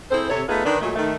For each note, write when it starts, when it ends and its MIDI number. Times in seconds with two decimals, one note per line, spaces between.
0.11 0.29 60
0.11 0.29 64
0.11 0.29 68
0.11 0.29 69
0.11 0.29 72
0.30 0.42 48
0.30 0.42 69
0.30 0.42 73
0.48 0.63 57
0.48 0.63 59
0.48 0.63 63
0.48 0.63 65
0.48 0.63 68
0.48 0.63 71
0.65 0.78 51
0.65 0.78 62
0.65 0.78 71
0.81 0.95 46
0.81 0.95 54
0.81 0.95 56
0.81 0.95 57
0.96 1.16 51
0.96 1.16 57